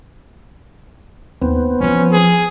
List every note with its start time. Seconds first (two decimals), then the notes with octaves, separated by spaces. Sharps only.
1.42 D#2 B3 C4
1.80 E3 F3 C#4
2.12 G#4